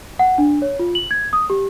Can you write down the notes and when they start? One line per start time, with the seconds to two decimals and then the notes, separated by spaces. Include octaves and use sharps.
0.19 F#5
0.38 D4
0.62 C#5
0.79 F4
0.95 F#7
1.11 G#6
1.33 D#6
1.50 G4